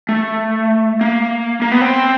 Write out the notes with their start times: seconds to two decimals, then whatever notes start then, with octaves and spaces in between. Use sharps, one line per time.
0.09 A3
1.01 A#3
1.62 A#3
1.72 B3
1.82 C4